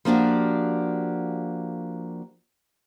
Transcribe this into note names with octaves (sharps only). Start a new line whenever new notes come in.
F3 A#3 D4 F#4 G4